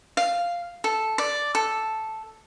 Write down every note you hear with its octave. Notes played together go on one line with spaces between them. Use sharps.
F5
A4
D5
A4